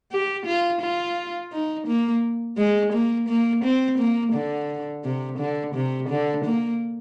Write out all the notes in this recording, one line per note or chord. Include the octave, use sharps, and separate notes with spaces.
G4
F4
F4
D#4
A#3
G#3
A#3
A#3
C4
A#3
D3
C3
D3
C3
D3
A#3